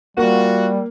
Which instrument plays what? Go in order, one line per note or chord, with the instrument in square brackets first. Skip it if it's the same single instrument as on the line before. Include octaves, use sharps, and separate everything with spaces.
[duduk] G3 [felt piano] A#3 [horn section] F4 F#4